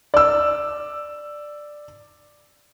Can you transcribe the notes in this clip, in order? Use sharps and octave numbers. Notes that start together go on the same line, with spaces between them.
D5 E6